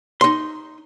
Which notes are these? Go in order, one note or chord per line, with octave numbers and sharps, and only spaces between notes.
D#4 C6